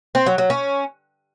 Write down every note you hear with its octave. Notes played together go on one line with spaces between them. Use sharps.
C4
F#3
F#3
C#4